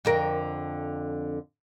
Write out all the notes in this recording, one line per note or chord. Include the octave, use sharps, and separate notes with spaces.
F2 D3 A#4